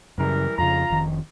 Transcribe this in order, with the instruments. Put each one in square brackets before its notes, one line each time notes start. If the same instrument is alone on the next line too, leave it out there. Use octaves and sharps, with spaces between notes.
[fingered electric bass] F#2 C#3 [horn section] E3 G3 A#4
[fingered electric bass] F2 C#3 [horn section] F4 A#5
[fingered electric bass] F1 D#3